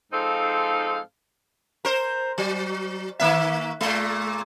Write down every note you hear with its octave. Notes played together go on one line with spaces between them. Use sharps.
G#2 F3 C4 D#4 A4 F5
A#4 C5
F#3
D#3 A#3 E5
A#2 G#3